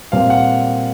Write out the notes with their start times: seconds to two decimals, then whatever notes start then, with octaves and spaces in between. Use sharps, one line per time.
0.12 A#2 G3 C4 F5
0.30 F#5